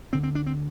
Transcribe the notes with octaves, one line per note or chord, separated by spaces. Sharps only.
D2 D3 C4
C4
D4
C4